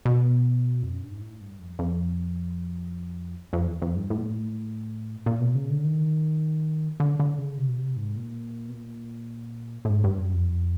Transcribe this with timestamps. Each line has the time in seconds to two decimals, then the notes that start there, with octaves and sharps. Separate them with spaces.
0.05 B2
0.83 F2
0.93 F#2
1.02 G2
1.12 G#2
1.21 A2
1.41 G2
1.60 F2
1.79 F2
3.53 F2
3.67 E2
3.82 F2
3.96 G2
4.10 A2
4.18 A#2
4.26 A2
5.26 A#2
5.41 B2
5.55 C#3
5.70 D3
5.84 D#3
7.00 D3
7.20 D3
7.38 C#3
7.58 C3
7.69 B2
7.77 C3
7.96 G#2
8.16 A#2
8.69 B2
8.74 A#2
9.85 A2
9.90 G#2
10.04 G2
10.18 F#2
10.33 F2